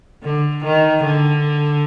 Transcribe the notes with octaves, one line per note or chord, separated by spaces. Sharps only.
D3
D#3
D3